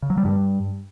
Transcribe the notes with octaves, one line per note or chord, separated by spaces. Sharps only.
C#3
F#3
G3
G2